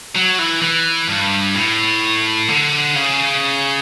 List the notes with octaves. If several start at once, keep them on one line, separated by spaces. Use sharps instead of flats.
F#3
E3
E3
G2
A2
D3
C#3